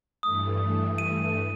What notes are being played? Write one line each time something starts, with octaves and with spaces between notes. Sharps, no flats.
G2 E3 A3 D#6
D#7